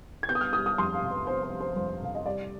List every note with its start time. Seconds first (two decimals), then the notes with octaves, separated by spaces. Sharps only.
0.23 G#6
0.29 B3 G6
0.35 D#6
0.41 F6
0.53 G3 D#6
0.66 D#6
0.78 F2 C6
0.94 F5
1.02 C3
1.11 B4
1.27 B3 C5
1.43 C5
1.52 G3
1.60 C5
1.76 F2 C5
2.02 C3 F5
2.15 D#5
2.25 G3 D5